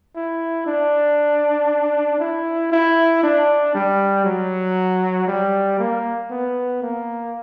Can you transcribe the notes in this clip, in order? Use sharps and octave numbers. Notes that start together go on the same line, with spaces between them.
E4
D4
E4
E4
D4
G3
F#3
G3
A#3
B3
A#3